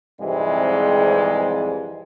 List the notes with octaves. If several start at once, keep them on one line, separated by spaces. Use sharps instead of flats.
F2 G#2 C3 E3 G3 G#3